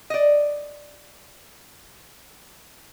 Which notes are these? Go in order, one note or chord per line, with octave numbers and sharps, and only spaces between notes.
D5 D#5